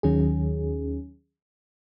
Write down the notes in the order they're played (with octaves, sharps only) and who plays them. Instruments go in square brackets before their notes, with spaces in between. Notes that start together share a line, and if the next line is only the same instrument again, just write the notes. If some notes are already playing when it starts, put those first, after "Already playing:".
[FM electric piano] D#2 D#3 F#3 C#4 G#4